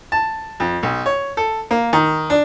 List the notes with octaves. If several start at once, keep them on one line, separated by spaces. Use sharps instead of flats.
A5
F2
B1
C#5
A4
A#3
D#3
D4